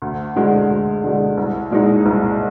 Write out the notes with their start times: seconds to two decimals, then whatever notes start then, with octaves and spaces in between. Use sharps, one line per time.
0.02 D2
0.36 D3 G#3
0.70 D2
1.03 D3 G#3
1.37 C2
1.71 A#2 G#3 D#4
2.06 C2